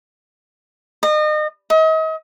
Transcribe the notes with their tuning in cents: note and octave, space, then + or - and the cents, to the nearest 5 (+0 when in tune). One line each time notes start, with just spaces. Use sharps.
D#5 -35
D#5 +40